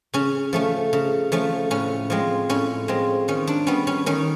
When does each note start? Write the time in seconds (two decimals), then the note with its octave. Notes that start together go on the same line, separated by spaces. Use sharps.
0.13 C#3 C#4
0.53 F3 A3 C#4
0.93 C#3
1.32 F3 A3 C#4
1.71 A2 C#4
2.10 F3 G#3 C4
2.49 A2 C#4
2.88 F3 G#3 C4
3.28 D#3 C#4
3.47 D4
3.67 G3 B3 C#4
3.87 C#4
4.06 D#3 C#4